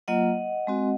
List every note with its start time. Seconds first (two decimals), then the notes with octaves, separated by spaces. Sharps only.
0.08 F#3 A#3 F4 D#5 F#5
0.67 G#3 C4 F#4